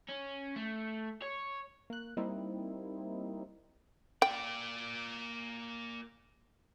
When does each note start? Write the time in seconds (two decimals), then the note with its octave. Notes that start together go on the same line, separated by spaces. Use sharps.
0.08 C#4
0.56 A3
1.22 C#5
1.90 A#3 F#6
2.17 G3 A#3 C4 D#4 E4
4.22 A#3 D5 G5